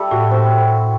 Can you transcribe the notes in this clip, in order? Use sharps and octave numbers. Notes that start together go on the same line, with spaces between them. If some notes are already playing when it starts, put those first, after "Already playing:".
Already playing: G3 E4 A4
A2 F#4
C4